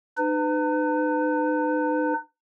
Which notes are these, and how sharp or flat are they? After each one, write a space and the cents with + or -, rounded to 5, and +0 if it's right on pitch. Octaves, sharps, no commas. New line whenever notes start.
D#4 -40 B4 +30